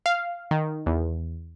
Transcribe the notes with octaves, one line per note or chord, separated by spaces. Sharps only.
F5
D#3
E2